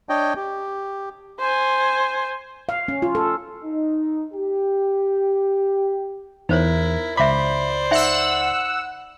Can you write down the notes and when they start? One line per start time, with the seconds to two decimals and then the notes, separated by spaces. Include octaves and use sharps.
0.09 D4 C#5 D#5 G5
0.36 G4
1.40 C5 G#5
2.69 F5
2.88 C#4
3.02 F4
3.15 A4
3.64 D#4
4.34 G4
6.49 E2 D#4 E4 A#4 C5 C#5
7.17 C#2 C5 D5 E5 B5 D6
7.91 D#4 E5 F#5 E6